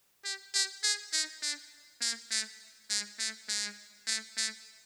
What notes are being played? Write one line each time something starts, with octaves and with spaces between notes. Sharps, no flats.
G4
G4
G#4
D#4
D4
A#3
A3
G#3
A3
G#3
A3
A3